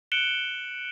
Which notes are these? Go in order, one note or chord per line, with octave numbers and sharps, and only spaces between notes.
F#6 C#7 D7 E7 F#7 G7